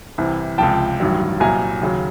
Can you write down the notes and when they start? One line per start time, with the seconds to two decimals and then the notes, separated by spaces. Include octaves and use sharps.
0.18 C2 C3 E3
0.58 C#2 C3 F3 G5 A5
1.00 A1 G2 D#3 F#3
1.40 C2 A#2 F#3 G#5 A#5
1.81 D#2 C#3 F#3